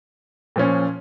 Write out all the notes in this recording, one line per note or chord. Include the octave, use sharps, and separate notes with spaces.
A#2 F3 C#4